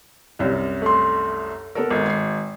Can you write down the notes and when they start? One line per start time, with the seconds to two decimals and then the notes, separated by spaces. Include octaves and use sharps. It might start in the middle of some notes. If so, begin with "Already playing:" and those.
0.39 C2 F#2
0.82 A3 C6
1.75 B3 A4 A#4
1.90 G#1
2.06 G#6 C7